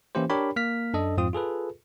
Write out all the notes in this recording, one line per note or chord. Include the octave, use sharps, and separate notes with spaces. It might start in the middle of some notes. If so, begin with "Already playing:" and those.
E3 A#3 C#4 E4 G4 C5
D4 G4 A#4 C#5 G5 B5
A#3 F6 B6
F#2 D4 A4 D#5
F2 G#2 F3 C4 F4 D#6
F4 G#4 A4 B4